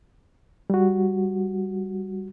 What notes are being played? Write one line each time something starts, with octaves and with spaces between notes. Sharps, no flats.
G3 F#4